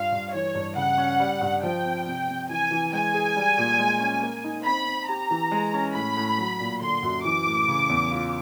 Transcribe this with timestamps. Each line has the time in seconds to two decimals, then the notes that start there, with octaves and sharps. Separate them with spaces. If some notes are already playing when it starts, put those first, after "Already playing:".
Already playing: G2 F4 F5
0.12 G2
0.33 E3 C#5
0.55 G2
0.76 C#3 F#5
0.98 C#4
1.20 G3
1.41 G2
1.63 F3 G5
1.85 C4
2.06 C3
2.28 C3
2.49 E3 G#5
2.71 E3
2.93 G#3 G#5
3.14 G#4
3.36 G3
3.58 A#2
3.79 G#3
4.00 C#4
4.22 A#3
4.44 D#4
4.65 C4 B5
4.87 C4
5.08 G4 A#5
5.31 E3
5.51 G#3
5.74 C#4
5.95 A2 B5
6.17 A2
6.38 F#3
6.60 A#2
6.81 D3 C6
7.03 F#2
7.25 E3 D6
7.46 A2
7.68 C#3
7.89 E2
8.11 F4